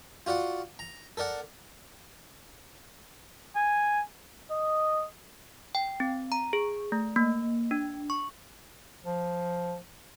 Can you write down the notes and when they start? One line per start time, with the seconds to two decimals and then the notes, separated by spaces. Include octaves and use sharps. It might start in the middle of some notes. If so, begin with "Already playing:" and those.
0.26 F4 F#4 D5 F#5
0.79 A#5
1.17 A4 A#4 D5 F#5
3.56 G#5
4.51 D#5
5.75 G5
6.00 C4
6.32 A#5
6.53 G#4
6.92 A3
7.16 A#3
7.71 D4
8.10 C#6
9.04 F3